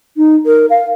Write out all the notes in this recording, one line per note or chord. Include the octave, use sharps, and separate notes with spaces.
D#4
A#4
F5